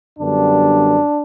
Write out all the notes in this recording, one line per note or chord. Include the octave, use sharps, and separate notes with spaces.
F#2 D3 G3 B3 D4